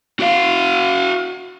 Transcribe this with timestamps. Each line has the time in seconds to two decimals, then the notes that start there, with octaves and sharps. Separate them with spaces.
0.20 F#4 F5